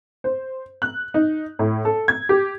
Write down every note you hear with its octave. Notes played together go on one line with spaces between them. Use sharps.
C5
F#6
D#4
A2
A4
G#6
G4